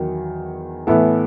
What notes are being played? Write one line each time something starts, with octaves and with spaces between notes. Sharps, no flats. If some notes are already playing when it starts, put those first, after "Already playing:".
Already playing: E2 D#3 F#3
A2 E3 B3 E4 A4